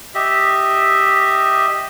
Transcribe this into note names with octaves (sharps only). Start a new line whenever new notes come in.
G4 D#5 E5